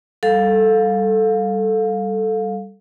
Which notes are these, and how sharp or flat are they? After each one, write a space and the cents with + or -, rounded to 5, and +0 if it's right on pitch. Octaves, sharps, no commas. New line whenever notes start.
G3 +0 A4 +0 F5 +20